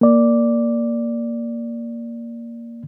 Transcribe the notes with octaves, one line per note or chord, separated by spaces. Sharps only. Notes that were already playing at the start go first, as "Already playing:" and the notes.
A#3 D5